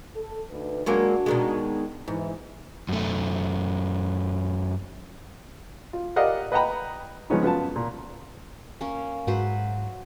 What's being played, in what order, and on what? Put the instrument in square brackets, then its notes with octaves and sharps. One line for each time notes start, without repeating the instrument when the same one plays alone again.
[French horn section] A4
D2 D#4 B4
[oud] F#3 G#3 A#3 [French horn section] D4 F#4
[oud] B2 D#3 G#3
[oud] G#2 [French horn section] E3
[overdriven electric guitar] F#2 A3
[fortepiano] F4
G4 A#4 D5 D#5 F5 F#5
B4 D#5 F#5 G5 A#5 B5
C#3 F3 G#3 B3 C#4 D#4
F#2 B3 F4 A5
A#2
[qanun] A#3 C#4
[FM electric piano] G#2 [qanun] F#3 B4 C5